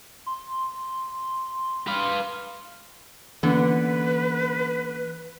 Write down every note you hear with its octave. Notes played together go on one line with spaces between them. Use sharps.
C6
B4 F5
D3 E3 A#3 B3 C#4 B4